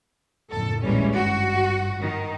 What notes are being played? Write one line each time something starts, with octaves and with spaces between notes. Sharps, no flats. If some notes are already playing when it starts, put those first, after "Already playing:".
F#1 F2 A2 A4
A#1 D#2 E3 G3 G#3 C#4
G#1 G2 F#4
D#3